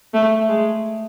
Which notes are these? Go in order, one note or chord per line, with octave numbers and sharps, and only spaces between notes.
A3
G#3